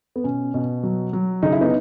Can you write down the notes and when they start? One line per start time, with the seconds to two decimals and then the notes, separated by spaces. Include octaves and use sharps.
0.16 B3
0.24 B2 C#4
0.54 B2
0.83 F#3
1.13 F#3
1.43 C#3 D#4
1.52 E4
1.61 B3 D#4